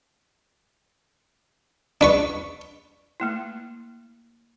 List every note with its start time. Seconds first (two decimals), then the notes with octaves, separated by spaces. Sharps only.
2.01 D4 B4 C#6
3.20 A3 A#3 E4